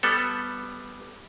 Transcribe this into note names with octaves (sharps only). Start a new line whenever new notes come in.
G3 B3 A4